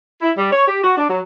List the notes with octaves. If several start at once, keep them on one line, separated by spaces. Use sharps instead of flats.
E4
G3
C#5
G4
F#4
D4
F#3